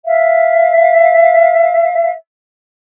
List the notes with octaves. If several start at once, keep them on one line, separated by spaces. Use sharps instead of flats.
E5 F5